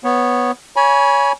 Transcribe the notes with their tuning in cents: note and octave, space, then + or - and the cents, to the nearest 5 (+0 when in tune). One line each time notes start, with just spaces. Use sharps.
B3 +0 C#5 -10
C#5 +20 G#5 +5 B5 -30